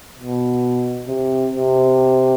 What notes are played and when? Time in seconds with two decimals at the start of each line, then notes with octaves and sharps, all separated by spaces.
0.19 B2
1.08 C3
1.53 C3